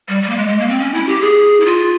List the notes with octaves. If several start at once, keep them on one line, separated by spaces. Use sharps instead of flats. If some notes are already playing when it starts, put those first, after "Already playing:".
G3
G3
A#3
G#3
G#3
A#3
C4
C#4
E4
G4
G#4
E4
F4